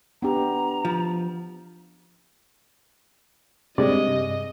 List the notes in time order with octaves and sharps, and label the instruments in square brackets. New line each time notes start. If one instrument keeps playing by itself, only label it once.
[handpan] B3 D4 G4 [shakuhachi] A#5
[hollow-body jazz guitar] F3
[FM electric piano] G2 C3 [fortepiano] G#3 D5 [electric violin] D#5